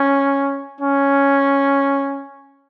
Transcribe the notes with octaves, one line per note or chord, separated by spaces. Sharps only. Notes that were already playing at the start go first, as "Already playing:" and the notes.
Already playing: C#4
C#4